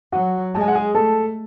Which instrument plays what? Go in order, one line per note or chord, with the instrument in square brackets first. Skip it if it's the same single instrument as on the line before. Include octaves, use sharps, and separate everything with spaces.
[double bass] F#3 [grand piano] F#4 F#5
[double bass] G#3 [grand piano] A5
[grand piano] G#5
F#5
G#4 G#5
[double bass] A3 [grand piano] A4 A5